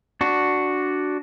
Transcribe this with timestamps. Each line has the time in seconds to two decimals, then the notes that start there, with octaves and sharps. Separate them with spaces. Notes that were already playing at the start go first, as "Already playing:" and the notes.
0.21 D4 F#4